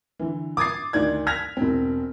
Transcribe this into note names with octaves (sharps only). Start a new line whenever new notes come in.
D3 E3
D6 D#6 G#6 A6 C7
D2 D#3 D5 G#6
F6 G#6 A#6 B6 F7
E1 C4